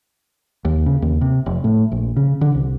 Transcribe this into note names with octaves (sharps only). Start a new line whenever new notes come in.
D#2
C#3
D#2
C3
F1
A2
A#1
C#3
D3
C2